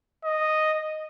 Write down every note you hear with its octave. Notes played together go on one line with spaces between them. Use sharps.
D#5